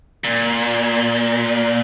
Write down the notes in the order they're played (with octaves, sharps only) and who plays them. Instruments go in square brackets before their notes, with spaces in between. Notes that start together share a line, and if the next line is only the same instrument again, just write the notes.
[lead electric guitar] A#2